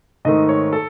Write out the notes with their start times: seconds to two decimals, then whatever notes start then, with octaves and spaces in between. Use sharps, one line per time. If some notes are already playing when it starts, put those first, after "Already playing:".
0.25 G#2 D#3 A3 D#5
0.49 C#5
0.73 A4